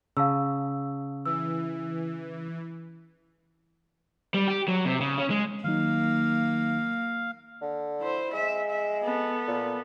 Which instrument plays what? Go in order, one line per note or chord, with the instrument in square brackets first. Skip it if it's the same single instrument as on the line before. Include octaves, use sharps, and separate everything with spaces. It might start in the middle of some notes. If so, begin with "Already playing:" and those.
[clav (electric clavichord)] C#3 [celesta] F5 A5 E6
[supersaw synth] E3 [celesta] E6
[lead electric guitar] G3
G4
F#3
C3
C#3
C#4
G#3
[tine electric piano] D#3 F#3 D#4 [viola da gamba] A#3 [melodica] F5
[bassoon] D3
[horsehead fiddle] E4 C5
[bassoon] G#3 [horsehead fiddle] E5
[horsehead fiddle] E5
B3 A4
[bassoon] A#2